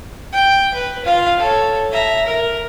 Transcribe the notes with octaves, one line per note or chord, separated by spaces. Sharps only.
G5
B4
F4 F5
A4 C#5
E5 A#5
A#4